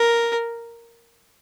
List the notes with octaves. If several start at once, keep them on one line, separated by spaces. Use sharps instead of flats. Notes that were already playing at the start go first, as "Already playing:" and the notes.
Already playing: A#4